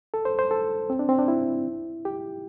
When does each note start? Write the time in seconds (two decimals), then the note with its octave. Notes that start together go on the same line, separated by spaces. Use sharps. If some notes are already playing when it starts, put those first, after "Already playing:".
0.14 A4
0.25 C5
0.39 C5
0.51 A4
0.90 C4
0.99 D4
1.09 C4
1.19 D4
1.28 E4
2.05 G4